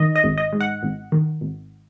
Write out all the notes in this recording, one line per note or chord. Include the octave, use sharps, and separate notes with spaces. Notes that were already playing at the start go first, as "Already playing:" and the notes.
Already playing: D#3 D#5
D#5
G#1
D#5
G#2
F#5
G#1
D#3
G#1